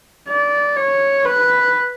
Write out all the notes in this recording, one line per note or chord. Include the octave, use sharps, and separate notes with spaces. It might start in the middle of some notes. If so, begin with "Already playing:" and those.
D5
C#5
B4